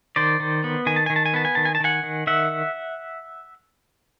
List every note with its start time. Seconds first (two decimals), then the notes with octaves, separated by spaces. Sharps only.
0.16 D#3 C5 D5
0.40 D#3
0.64 B3
0.86 D#3 G#5
0.96 A5
1.06 D#3 G#5
1.16 A5
1.26 G#5
1.34 B3 A5
1.45 G#5
1.55 D#3 A5
1.65 G#5
1.75 A5
1.80 D#3 F#5 G#5
2.03 D#3
2.27 D#3 E5 F#5